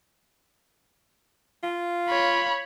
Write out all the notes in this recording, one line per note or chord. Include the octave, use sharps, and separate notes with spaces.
F4
C#5 B5